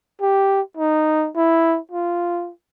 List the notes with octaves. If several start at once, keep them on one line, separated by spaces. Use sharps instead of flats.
G4
D#4
E4
F4